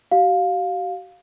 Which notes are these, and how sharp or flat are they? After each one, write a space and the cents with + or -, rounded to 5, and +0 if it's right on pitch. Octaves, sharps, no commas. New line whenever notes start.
F#4 +45 F5 +15